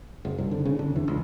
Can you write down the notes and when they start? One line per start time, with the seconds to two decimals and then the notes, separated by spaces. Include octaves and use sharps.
0.25 F#1
0.38 C2
0.51 D3
0.65 C#3
0.79 D3
0.96 E2
1.08 C#2